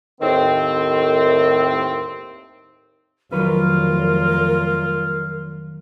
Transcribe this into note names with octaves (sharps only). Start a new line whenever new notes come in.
D#2 A2 D#3 C4
F1 D#3 F#3 F4 A#4 B4